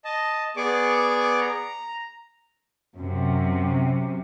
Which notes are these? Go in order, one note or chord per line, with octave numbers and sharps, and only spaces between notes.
D#5 A5
B3 G#4 D5 C#6 D6
A#5
F#2 C3